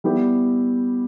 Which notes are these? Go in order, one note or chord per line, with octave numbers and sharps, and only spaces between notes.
G3 B3 E4 G4